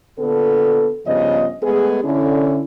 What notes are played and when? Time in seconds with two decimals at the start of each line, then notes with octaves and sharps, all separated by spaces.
0.19 A#2 D3 B3 A4
1.06 G2 C#3 F3 B3 D#5
1.63 G#3 A3 B3 G#4
2.04 D3 C#4 E4